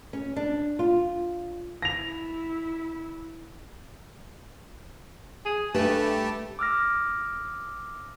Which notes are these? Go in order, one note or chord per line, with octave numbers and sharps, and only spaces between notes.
C#4
D4
F4
E4 A#6 F7
G#4
G2 A3 G4 B4 A5
D6 E6 F6 A#6